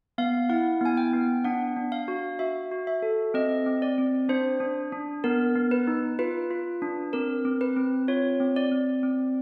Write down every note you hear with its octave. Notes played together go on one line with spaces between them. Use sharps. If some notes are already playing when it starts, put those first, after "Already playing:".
B3 F5
E4 F#5
B3 G#5
G5
B3
D4 F#5
D4
F5
F#4
F#4 E5
F#4
E5
A4
C4 D#5
C4
D5
C4
D4 C5
D4
D4
B3 A#4
B3
B4
D#4
F4 B4
F4
D4
C4 A#4
C4
B4
C4
F4 C#5
C4
D5
C4
C4